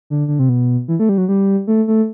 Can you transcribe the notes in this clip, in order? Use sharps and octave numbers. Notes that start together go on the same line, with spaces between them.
D3
D3
C3
B2
E3
A3
G3
F#3
G3
A3
A3